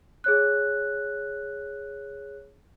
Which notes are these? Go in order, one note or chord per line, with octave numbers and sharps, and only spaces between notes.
G#4 C#5 F#6